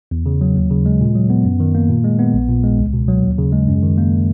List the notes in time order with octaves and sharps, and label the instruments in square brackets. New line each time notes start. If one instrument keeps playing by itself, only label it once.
[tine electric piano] E2
C#3
F#3
D#2
C#3
G#3
A#2
F#3
B3
F#2
D#3
A#3
A#2
G#3
B3
A#1
A#2
G#3
C#2
B2
F#3
D#2
C#3
G#3
F#2
D#3
A#3